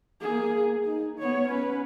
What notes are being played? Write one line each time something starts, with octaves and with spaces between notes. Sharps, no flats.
A#3 G#4
D#4
B3 C#5
C#4 B4